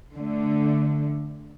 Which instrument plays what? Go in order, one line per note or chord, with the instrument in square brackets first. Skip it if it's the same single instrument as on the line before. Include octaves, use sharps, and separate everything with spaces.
[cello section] D3 A3